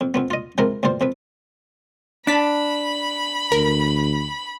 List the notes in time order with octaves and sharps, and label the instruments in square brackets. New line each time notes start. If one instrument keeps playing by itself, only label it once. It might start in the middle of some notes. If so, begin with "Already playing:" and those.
[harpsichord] F2
F2 F3 B3
F4 D#5
C3 F3 G#3 E4 F4 A#4
D2 G2 F4 C5
F2 F3 B4
[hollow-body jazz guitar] D4 [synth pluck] A5 B6 [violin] B5
[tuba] D2 [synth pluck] A#4